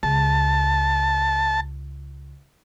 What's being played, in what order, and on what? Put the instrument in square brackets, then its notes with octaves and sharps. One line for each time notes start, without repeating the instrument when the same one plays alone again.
[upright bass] C#2 [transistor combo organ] A5